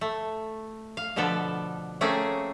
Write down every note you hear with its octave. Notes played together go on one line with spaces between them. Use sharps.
A3
F5
B2 D3 F3 B3 A4
A3 A#3 C4 C#4 G#4